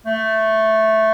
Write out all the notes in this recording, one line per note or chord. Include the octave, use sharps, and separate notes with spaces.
A3